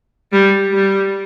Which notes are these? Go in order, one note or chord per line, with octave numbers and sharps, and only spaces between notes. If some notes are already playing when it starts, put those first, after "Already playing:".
G3
G3